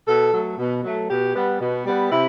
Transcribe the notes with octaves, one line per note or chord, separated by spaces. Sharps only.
B2 A4
F#3 A3
B2
F#3 A3
B2 G4
G3 B3
B2
G3 B3
C3 E4